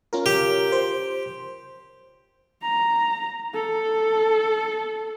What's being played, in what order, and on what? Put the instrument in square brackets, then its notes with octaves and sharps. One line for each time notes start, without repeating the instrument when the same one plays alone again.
[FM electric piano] C#4 F4 A#4
[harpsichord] G4
[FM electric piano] C5
[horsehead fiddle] A#5
A4